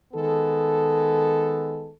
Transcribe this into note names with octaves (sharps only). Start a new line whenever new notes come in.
D#3 G#3 B3 A4